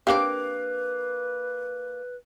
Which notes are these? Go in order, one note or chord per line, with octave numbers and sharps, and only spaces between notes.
A#3 C4 D4 G4 B4 F5 D6